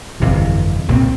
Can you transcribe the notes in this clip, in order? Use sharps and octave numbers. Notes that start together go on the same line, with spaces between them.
G1 F2 C3 E3
C2 A#2 F3 C4